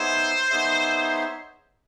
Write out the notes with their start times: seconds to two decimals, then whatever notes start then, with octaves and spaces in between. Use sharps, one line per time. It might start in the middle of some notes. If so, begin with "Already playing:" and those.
Already playing: B3 D#4 G#4 C5 C#5 E5
0.50 B3 D#4 G#4 C#5 E5